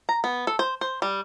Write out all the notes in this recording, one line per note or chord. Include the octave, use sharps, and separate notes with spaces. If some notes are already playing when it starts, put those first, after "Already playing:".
A#5
B3
A4
C5
C5
G3